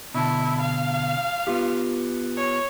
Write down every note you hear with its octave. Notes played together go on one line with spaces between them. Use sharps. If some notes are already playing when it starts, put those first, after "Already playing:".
B2 D3 E4 A5
F5
B3 F4 G4
C#5